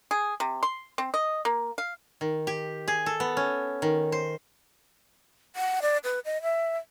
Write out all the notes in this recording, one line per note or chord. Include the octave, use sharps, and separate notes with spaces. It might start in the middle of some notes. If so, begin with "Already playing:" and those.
G#4
C3
C6
C4
D#5
A#3
F5
D#3
G4
G#4
A4
B3
C#4
D#3
C5
F#5
D5
B4
D#5
E5